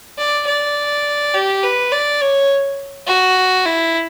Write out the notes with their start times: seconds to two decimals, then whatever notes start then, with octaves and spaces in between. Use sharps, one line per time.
0.18 D5
0.47 D5
1.34 G4
1.63 B4
1.92 D5
2.21 C#5
3.07 F#4
3.65 E4